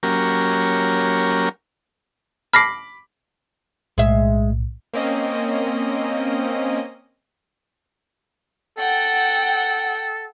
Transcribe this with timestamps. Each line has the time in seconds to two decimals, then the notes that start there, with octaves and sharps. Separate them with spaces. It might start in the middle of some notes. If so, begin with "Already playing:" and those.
0.03 F#3 A#3 C#4 G4 A#4
2.53 B5 D6 F6 A#6 C7
3.98 B1 A2 G#3 E5
4.94 A#3 C4 C#4 D#5
8.78 A4 F#5 G5